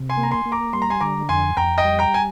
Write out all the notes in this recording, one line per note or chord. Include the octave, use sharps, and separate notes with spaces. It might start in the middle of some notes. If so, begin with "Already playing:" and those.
Already playing: C3
G#5 C6
A#3
A#5
G#5 C6
A#3
A#5 D6
G3 C6
A#5
G#5 C6
D3 A#5 D6
F2 G#5 C6
F2 G5 A#5
D#5 G5
G3
G5 A#5
G#5